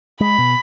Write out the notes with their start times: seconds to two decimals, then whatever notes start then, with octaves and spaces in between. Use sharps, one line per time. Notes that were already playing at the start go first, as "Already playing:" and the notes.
0.20 G#3 B5
0.38 B2